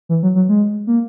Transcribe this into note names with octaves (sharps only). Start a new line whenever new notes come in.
E3
F#3
F#3
G#3
A#3